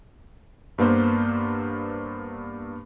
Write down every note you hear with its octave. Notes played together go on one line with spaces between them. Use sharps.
G2 A#3 B3 C5